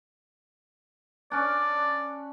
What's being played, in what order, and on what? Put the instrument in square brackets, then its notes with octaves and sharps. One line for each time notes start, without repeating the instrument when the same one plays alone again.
[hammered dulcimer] C#4 D4 [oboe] D5